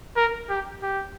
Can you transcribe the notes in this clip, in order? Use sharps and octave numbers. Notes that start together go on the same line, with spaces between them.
A#4
G4
G4